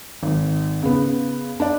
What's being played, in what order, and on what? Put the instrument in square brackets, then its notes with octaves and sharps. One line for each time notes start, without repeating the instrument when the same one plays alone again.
[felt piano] G#1
C#3 B3
D4 D5